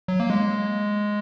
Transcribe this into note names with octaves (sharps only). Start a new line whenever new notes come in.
F#3
A#3
G#3